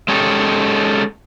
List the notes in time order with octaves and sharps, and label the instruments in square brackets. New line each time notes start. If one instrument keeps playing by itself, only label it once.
[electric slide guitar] G#3 C#4 D#4 G4 A4